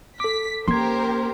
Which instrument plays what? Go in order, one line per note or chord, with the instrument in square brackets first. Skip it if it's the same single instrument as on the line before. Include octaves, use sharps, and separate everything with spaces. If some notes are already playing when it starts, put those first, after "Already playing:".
[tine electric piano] A4 D6 [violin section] B6
[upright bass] A#3 C#4 [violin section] G4 A#4 C5 [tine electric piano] C6 G#6